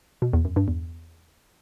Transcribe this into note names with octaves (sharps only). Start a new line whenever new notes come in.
B2
E2
F#2
G2
E2